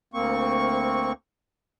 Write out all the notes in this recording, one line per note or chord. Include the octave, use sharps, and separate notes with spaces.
D2 A#3 C4 C#6